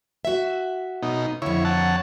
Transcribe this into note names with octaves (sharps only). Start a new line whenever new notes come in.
F#4 E5
B2 D#4
F2 D3 E4 C#5
C#5 F#5 A5